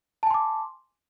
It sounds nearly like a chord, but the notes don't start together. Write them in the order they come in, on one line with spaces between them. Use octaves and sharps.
A5 G#5 C6 D6